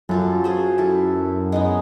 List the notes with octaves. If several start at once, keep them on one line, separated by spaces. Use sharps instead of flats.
F#2 C#4 F4 A4
C#4 G#4 C5
E4 A4
G#3 B3 D#4